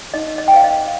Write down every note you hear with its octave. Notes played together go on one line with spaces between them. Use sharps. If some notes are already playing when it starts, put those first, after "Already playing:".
D#4 D#5
D#5
G5
G#4 C5 F5
D#5